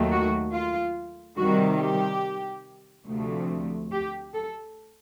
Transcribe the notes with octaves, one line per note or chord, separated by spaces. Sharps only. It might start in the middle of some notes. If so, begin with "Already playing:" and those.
Already playing: D#2 D#3 F#3 A3
F#4
F4
C3 D#3 G3 F#4
G4
D2 C3 F3 A3
G4
A4